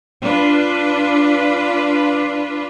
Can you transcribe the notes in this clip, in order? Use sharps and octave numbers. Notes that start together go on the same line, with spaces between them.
D4 F4 B4